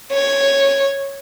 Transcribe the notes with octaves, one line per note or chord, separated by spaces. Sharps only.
C#5